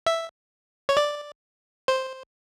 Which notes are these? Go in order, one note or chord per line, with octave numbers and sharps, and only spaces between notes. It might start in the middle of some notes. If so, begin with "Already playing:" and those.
E5
C#5
D5
C5